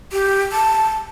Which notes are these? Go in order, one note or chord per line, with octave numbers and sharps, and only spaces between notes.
G4
A5